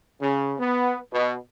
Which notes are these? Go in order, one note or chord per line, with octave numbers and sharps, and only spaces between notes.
C#3
B3
B2